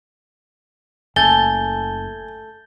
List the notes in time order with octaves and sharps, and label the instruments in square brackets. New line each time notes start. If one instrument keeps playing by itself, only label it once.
[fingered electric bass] F#1 [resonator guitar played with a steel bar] A3 A4 A5 [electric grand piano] G#5 [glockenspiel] G6 A6 G7